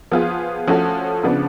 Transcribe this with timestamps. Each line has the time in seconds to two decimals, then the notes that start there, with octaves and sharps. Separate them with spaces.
0.12 F3 B3 F4 G#4
0.68 F3 A3 C#4 F#4 A4
1.23 C#3 F3 B3 D4